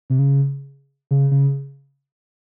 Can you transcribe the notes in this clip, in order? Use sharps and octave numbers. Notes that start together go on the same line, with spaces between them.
C3
C#3
C#3
C#3